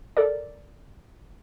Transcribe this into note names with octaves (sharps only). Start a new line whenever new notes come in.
A4 A#4 D5